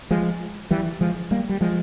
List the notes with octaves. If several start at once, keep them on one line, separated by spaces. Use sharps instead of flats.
F3 G#3
E3 G3
F3 G#3
G3 A#3
G3
F3 G#3